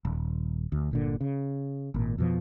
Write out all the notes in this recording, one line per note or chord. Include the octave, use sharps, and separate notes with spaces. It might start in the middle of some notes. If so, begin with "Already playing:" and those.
D#1
D2
G1 A#2 D3
C#3
G#1 A#2
F2 B2 F3